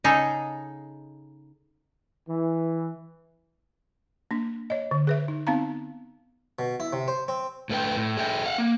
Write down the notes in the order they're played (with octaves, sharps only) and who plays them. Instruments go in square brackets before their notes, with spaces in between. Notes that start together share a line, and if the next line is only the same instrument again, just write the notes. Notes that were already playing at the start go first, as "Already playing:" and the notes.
[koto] C#3 D#4 G#4 A4
[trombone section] E3
[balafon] A#3 D4
C#5 D#5
D3
G#4 B4 E5
D#4
B3 C4 D#4 F5 A5 A#5
[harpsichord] B2
E4
C3
C5
C4
[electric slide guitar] A2 A3 B4 G5
A2
G#4 A4 E5 G5
F5 F#5
A#3